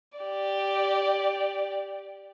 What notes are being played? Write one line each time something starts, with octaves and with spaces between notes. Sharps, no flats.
G4 D5